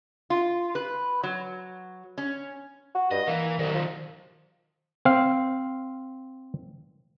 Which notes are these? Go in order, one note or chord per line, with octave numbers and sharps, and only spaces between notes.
F4
B4
F#3
C#4
F#4
G2 D#5
E3 A#3
C2 D#3 F#3
F3
C4 F5